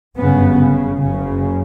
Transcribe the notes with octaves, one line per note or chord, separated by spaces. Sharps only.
G1 F#2 C#3 B3
C#3
F#1 F#2 C#3